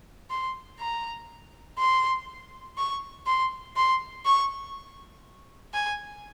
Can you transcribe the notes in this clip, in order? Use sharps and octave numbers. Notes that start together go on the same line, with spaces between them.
C6
A#5
C6
C#6
C6
C6
C#6
G#5